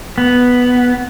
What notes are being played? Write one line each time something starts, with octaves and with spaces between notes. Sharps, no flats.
B3